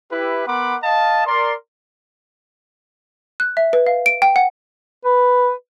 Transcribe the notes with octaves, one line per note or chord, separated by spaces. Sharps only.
E4 G4 B4
B3 A#4 F#5 B5 C6 D6
D#5 F5 A5
A#4 D5 C6
F#6
E5
B4
F5
D7
G5
F#5
B4